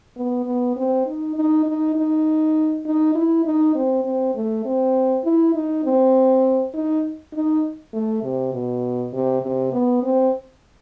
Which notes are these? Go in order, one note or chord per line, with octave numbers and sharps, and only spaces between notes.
B3
B3
C4
D#4
D#4
D#4
D#4
D#4
E4
D#4
C4
C4
A3
C4
E4
D#4
C4
D#4
D#4
A3
C3
B2
C3
C3
B3
C4